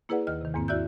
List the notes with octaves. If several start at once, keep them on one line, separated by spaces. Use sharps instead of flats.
A#3 E4 G#4 B4 D5 F#5
D#2 D#3 D#5 F6
C3 D#3
E2 G#2 A#3 C4
E4 F#4 D5 E5 E6 G6